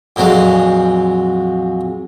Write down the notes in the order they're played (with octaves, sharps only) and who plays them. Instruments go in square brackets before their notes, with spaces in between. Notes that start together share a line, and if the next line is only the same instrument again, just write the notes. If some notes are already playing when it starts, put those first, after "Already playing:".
[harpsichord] F2 A#2 F#3 G#3